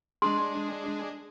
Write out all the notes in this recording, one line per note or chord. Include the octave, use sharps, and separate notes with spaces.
G#3 D4 G#4 C6